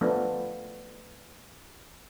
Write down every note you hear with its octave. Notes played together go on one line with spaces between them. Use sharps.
F3 A3 B3 D4